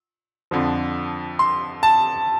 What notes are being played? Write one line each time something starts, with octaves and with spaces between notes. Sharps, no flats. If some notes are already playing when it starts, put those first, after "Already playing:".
F2 D3 F3
C6
A5